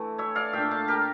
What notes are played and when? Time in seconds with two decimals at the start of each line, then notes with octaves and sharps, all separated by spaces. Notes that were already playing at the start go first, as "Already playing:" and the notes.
Already playing: E3 A3
0.18 C#5 E5
0.35 D5 F5
0.53 A#2 A3 D4 E5 G5
0.71 F5 A5
0.88 G4 A#4